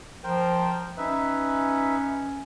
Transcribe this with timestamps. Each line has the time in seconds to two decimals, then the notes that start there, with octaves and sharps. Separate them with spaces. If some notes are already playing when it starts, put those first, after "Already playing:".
0.24 F3 A#4 C5 G5
0.97 C#4 D#4 B4 E5